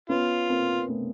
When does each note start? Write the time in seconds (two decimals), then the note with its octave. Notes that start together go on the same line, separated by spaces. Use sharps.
0.09 B3 C#4 F4
0.49 A#3 C4
0.88 A3 B3